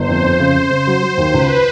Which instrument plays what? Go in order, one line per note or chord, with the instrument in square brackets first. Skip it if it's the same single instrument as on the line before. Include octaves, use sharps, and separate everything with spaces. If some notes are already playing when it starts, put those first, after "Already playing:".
Already playing: [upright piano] G1 [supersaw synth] C5
[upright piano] F2
F2
C#3
C#3
C#3
F#3
F#3
D#2
[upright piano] C#2 [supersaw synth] B4